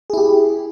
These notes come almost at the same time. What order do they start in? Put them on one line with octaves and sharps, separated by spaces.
G#4 E4 G4